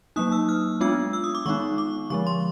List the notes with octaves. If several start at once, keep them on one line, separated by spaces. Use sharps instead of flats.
F#3 A#3 D#4 D#6
E6
F6
G#3 B3 D4 F4 E6
E6
D#6
D6
D#3 G#3 B3 D#4 C#6
D6
D3 F3 G#3 C#6
C6